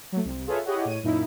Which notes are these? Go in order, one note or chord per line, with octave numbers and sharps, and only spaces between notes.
F#3 A3
C2
F4 G#4 A4 B4 C#5 E5
E4 G4 G#4 C#5 D#5 F#5
A2 C#5 D#7
F#2 A#2 D#4 E4